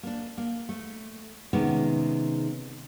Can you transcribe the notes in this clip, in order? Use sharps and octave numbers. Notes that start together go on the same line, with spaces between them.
A#3 D4
A#3
A3
C3 D#3 G#3 B3 C#4